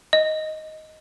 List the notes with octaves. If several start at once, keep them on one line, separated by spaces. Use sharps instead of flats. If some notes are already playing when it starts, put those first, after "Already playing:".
D#5